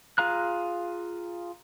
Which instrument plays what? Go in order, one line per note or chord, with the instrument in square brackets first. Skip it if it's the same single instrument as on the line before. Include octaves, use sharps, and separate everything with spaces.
[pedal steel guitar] F4 G#4 F5 A#5 F#6